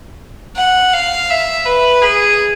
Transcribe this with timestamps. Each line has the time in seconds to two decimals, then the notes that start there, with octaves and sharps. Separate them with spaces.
0.56 F#5
0.93 F5
1.30 E5
1.66 B4
2.02 G#4